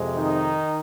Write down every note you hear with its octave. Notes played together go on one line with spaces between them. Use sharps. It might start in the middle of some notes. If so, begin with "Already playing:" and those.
Already playing: F2 C3 G#3
D#3 D#4